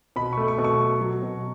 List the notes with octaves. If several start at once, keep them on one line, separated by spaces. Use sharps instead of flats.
B2 B5
A3 C#6
C#6
B2
C#6
F#3
F#3
B2